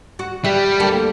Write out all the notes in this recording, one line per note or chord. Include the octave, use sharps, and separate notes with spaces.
F#4
G3 G4 B4 E5
D2 A#3 A4